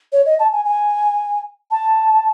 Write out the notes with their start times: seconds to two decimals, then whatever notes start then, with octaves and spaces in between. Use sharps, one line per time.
0.12 C#5
0.26 D#5
0.39 A5
0.52 G#5
0.65 G#5
1.71 A5